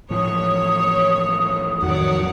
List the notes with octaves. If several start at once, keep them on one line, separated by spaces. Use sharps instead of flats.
A2 E3 F3 C#5 D#6
F2 A2 D#3 F#3 C#5 D5 F#5